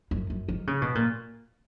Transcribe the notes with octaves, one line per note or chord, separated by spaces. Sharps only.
F#2
F#2
D#3
C#3
B2
A#2